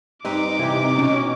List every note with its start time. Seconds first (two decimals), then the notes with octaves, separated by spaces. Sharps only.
0.25 G2 C4 D#4 B4 D6
0.59 C3 E3 G4
0.98 B2 C#4 F#4